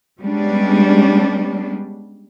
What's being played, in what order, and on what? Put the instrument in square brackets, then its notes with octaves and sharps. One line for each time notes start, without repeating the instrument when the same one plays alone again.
[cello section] G3 G#3 B3 C#4 D4